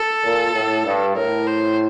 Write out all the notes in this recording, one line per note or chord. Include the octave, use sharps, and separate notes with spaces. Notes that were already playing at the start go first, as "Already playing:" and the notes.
Already playing: A4
A#2
A2
G2
A2 A#4
C5